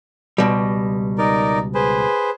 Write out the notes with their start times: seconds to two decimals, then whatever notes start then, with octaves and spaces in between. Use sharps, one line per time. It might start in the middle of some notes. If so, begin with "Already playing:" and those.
0.38 C#2 B2 G3
1.18 D#4 A#4 D5
1.75 G#4 B4 C5